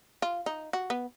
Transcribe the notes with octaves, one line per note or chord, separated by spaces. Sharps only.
F4
D#4
F#4
B3